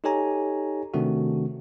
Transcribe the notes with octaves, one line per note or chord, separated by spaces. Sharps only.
D#4 G4 A4 C#5 G#5 A#5
C3 D#3 A3 C4 D4 F#4